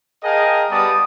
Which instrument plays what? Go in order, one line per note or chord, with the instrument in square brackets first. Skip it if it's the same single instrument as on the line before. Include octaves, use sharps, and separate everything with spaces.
[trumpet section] G#4 A#4 D#5 F5 G5 A5
G3 B3 D5 A5 D#6